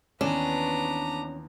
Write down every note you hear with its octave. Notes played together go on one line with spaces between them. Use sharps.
D#2 E3 B3 C#4 D4 A#5